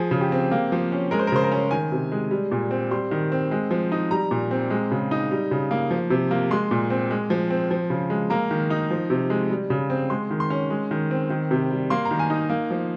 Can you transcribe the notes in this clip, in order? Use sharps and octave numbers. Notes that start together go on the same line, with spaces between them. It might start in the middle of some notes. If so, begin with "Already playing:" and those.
Already playing: F3 G#4
C#3
G4
C4
A#3
F3
C#4
G#3 A#4
C5
A#4
C#3 C5
A#4
C#4
D#3 G#5
C3
G#3
G3
A#2
C4
G3 C6
D#3
C4
G#3
F3
D#4
G3 A#5
A#2
C4
G#3
C#3
D#4
G3
C#3
A#3
F3
C3
A#3
G#3 C6
A#2
C4
G#3
F3
C4
F3
C#3
G#3
A#3 A#5
D#3
D#4
F3
C3
G#3
G3
C#3
C4
G#3 C6
D#3
C6
C#4
G#3
D#3
C4
D#3
C3
G3
A#3 C6
A#5
D#3
G#5
D#4
A#3
F3